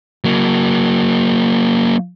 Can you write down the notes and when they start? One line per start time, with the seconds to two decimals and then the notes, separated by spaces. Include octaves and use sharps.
0.24 F#3 A#3